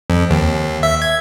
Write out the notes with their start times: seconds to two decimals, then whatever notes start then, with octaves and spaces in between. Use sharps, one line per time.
0.10 F2
0.30 D#2
0.83 E5
1.02 G#6